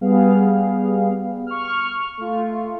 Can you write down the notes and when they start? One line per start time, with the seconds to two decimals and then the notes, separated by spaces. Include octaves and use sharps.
0.01 G3 B3 G#4 F5
1.47 C#6 F6
2.17 A3 F4